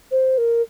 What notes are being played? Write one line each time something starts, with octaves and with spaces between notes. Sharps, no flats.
C5
A#4